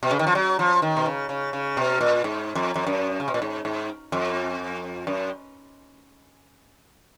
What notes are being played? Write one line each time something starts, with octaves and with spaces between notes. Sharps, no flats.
B2
C#3
D#3
F3
F#3
F3
D#3
B2
C#3
C#3
C#3
B2
A#2
G#2
F2
F2
F#2
C#3
B2
A#2
G#2
G#2
F2
F#2